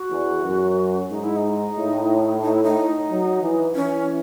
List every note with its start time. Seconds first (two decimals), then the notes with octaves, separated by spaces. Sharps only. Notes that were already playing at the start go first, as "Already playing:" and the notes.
Already playing: F#4
0.11 E2
0.44 F#2
1.10 G#2 D#4
1.24 E4
1.37 D#4
1.77 A2
2.43 D#4
2.53 E4
2.63 D#4
3.10 F#3
3.42 E3
3.75 E3 C#4